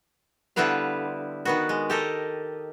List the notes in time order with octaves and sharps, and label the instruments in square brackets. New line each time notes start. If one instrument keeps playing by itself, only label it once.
[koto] D3 G3 B3 E4 B4 F5
D#3 B3 F#4
G#3
G4 A4 A#4 D#5